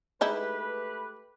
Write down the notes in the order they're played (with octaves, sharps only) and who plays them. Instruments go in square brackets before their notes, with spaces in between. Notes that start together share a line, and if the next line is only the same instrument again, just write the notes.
[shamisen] G#3 D#4 E4 [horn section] A3 G4 B4